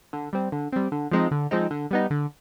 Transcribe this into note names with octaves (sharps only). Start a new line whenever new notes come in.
D3
G3 C4
D3
G3 C4
D3
F3 G#3 C4 D#4
D3
F3 G#3 C4 D#4
D3
G3 B3 D#4
D3